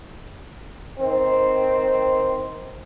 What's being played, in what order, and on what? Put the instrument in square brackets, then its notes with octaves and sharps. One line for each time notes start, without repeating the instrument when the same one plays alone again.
[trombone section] D#3 C4